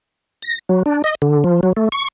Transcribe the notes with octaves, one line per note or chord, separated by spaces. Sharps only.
A#6
F#3
D4
D#5
D3
F3
F#3
A3
C#6